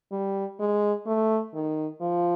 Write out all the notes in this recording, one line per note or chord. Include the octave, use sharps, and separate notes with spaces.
G3
G#3
A3
D#3
F3